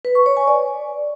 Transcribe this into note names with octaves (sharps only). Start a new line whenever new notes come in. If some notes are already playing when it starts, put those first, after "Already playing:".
B4
C#6
C#5
G#5
D5